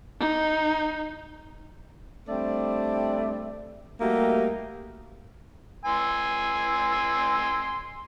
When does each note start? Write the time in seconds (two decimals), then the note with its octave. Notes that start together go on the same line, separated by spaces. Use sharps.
0.20 D#4
2.29 G3 A3 C4 D4 D5
4.01 G3 A3 A#3 D#4 F#4 G4
5.85 G#5 C6 E6